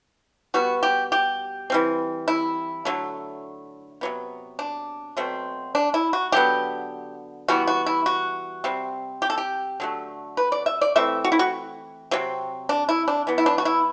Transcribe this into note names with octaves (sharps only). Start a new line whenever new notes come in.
B2 G3 B3 F#4
G4
G4
E3 G3 C4
E4
D3 F#3 A3
C3 F#3 B3
D4
B2 F#3 A3 C4
D4
E4
F#4
D3 F#3 B3 G4
E3 G3 B3 F#4
F#4
E4
F#4
C3 G3 C4
G4
A4
G4
D3 F#3 A3
B4
D5
E5
D5
E3 A3 C4 E5
F#4
E4
F#4
C3 F#3 C4
D4
E4
D4
E3 B3
E4
D4
F#4
E4